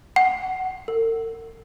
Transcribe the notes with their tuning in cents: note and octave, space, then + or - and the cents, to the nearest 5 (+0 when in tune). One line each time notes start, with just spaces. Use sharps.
F#5 +10
A#4 -45